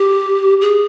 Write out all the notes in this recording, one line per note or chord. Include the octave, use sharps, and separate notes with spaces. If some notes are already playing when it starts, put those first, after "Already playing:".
Already playing: G4
G#4